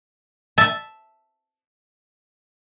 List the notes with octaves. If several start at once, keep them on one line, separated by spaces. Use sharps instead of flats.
E5 A5